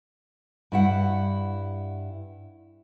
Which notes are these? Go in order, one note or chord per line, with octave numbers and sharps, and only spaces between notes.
G2 E4 F#5